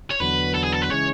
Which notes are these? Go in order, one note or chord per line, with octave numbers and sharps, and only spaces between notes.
C#5
E2 D3 F#3 B3 B4
A4
G#4
A4
B4
C#3 E3 G#3 C#4 C#5